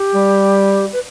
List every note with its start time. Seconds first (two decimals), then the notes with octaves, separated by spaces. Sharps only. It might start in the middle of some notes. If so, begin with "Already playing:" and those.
Already playing: G4
0.15 G3
0.93 B4